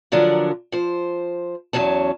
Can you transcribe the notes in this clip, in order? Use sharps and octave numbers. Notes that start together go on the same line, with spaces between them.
D3 F3 F#3 D4 A#4
F3 C5
E2 G2 F#3 C#4 A5